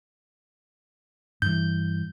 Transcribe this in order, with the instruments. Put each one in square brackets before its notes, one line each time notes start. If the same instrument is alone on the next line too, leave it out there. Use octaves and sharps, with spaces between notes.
[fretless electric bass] G2 E3 [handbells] G6